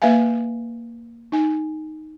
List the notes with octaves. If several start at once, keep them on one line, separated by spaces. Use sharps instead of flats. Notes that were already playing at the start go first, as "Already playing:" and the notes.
A#3 B4 E5 F5 G#5
D#4 G#5